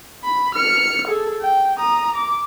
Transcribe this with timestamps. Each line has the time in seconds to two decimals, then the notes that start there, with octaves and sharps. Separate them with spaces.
0.24 B5
0.55 F6 C#7
1.08 G#4 A4
1.42 G5
1.78 A#5 D#6
2.15 D6